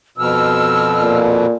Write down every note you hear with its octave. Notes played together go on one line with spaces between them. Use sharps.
F2 B2 E6 F6
A#2